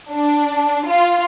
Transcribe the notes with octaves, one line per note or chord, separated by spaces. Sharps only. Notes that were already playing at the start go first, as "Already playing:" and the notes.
D4
F4